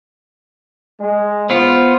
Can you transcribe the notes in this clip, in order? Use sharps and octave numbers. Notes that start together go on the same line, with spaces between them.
G#3
B3 F4 C5